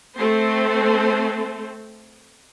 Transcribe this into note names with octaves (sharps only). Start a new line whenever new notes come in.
A3 C4 A4 C5